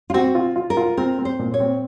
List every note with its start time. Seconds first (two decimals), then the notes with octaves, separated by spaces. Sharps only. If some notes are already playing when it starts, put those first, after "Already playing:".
0.10 F4
0.14 C4 F#4
0.35 F4
0.56 F4
0.70 A#4
0.77 F4
0.97 C4 A#4
1.19 C4
1.25 C5
1.39 A#2
1.54 C#5
1.60 C4